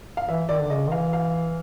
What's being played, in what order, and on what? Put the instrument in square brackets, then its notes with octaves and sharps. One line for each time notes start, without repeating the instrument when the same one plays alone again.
[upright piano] F5
[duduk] E3 [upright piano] E5
[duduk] D#3 [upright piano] D5
[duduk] D3
[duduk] C#3 [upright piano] D#5
[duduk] D#3
[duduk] E3 [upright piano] F5
[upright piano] F5